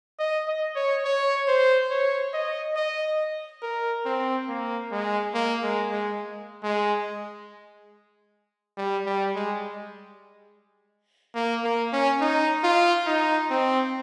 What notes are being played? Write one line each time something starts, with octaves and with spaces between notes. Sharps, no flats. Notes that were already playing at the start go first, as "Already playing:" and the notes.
D#5
D#5
C#5
C#5
C5
C#5
D#5
D#5
A#4
C4
A#3
G#3
A#3
G#3
G#3
G#3
G3
G3
G#3
A#3
A#3
C#4
D#4
F4
D#4
C4